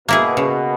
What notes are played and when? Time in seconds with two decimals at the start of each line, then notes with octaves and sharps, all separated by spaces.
0.08 B2 A#3 E4 G#4
0.37 C#3